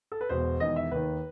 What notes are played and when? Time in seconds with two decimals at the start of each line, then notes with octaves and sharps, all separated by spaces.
0.12 A4
0.21 B4
0.29 E1 E2 B2 C5
0.60 E1 E2 D#3 D#5
0.76 E5
0.91 D#2 D#3 B4